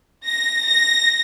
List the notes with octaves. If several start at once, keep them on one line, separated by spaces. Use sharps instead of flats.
A#6
A#6